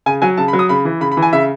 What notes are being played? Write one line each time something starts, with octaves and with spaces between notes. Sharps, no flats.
C#3 G#5
F#3 G#5
C#3 A5
B5
F#3
D#6
C#3 B5
E3
C#3 B5
B5
E3
G#5
C#3 E5